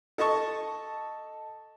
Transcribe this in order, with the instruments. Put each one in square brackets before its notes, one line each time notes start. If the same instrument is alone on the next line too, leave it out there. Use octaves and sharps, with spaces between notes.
[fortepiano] A4 D#5 A5 C#6